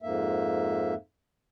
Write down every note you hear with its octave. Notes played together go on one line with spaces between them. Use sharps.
F2 G#2 A#3 E5